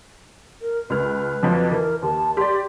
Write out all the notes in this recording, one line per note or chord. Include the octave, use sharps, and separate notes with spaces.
A#4
C#2 B4 F6
F2 F3 F#3
E3 A#4
D#2 A5
G4 D5 C6